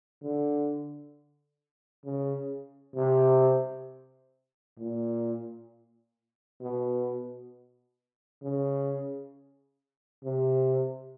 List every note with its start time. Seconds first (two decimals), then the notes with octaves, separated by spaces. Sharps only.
0.23 D3
2.05 C#3
2.96 C3
4.78 A#2
6.61 B2
8.43 C#3
10.24 C3